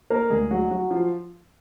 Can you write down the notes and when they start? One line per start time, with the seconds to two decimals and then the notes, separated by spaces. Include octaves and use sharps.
0.10 A#3 A#4
0.30 D2 D3 G#3 G#4
0.51 F#3 F#4
0.71 F#3 F#4
0.91 F3 F4